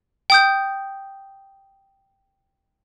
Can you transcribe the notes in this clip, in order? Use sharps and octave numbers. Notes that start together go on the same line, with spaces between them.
G5 D#6 G6